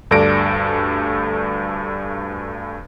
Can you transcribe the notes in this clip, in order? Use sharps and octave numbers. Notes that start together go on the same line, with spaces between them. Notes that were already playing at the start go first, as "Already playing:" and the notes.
D2 G2 A4 D5 A#6 D7